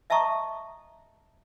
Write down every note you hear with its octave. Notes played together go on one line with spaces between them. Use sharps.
D#5 E5 A5 A#5 C#6 D#6